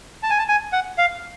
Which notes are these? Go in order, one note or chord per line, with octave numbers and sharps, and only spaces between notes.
A5
G#5
A5
G#5
F#5
F5